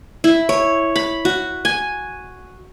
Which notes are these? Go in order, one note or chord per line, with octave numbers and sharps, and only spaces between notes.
E4
C#5
B5
F#4
G#5